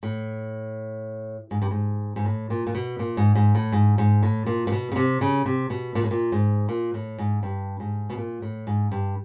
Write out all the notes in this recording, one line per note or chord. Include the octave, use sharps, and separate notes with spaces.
A2
G#2
G2
G#2
G#2
A2
A#2
A#2
B2
A#2
G#2
G#2
A2
G#2
G#2
A2
A#2
A#2
B2
C#3
C3
C#3
C3
B2
A#2
A2
A#2
G#2
A#2
A2
G#2
G2
G#2
B2
A#2
A2
G#2
G2